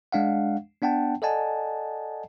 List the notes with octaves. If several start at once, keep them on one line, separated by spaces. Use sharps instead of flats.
G#3 D4 F5 F#5
B3 D4 F#5 G5 A5
A4 D5 D#5 F#5 G#5 A5